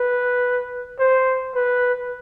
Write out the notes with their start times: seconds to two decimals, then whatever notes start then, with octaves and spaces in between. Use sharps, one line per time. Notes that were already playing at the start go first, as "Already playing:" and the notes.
Already playing: B4
1.00 C5
1.55 B4